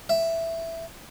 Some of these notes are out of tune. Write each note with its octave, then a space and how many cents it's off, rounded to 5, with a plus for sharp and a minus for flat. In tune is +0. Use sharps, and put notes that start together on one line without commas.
E5 +5